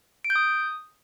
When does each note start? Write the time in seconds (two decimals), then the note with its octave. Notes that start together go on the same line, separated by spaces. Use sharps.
0.24 D7
0.30 G6
0.36 D#6